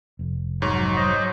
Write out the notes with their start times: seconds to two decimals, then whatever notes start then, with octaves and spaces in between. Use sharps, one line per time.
0.19 F1
0.62 G#2 F#3 C#5 C#6
0.96 C5 D#5